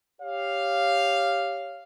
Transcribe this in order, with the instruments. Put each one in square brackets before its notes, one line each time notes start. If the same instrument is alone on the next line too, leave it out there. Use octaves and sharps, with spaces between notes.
[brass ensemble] G4 C#5 F5